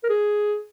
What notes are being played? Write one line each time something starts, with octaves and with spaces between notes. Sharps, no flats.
A#4
G#4